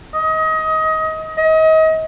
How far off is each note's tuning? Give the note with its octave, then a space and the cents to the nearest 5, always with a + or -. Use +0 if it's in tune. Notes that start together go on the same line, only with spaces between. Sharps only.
D#5 +25
D#5 +35